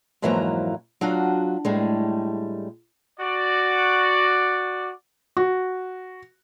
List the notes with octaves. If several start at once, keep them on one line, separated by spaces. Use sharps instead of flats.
F2 G#2 E3 F#3 A#3 A#5
F#3 D4 F4 F#4
A2 G3 G#3
F#4 D5
F#4